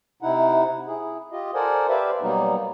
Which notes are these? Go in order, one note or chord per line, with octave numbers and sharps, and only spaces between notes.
C3 D#4 E4 F#5
E4 G#4
F4 G4 D#5
A4 A#4 C5 D5 F#5 G#5
G4 B4 C5 D5 E5 F5
B2 F#3 G3 A#3 B3 D#4